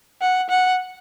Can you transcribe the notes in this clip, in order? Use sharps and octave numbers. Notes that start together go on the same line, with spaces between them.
F#5
F#5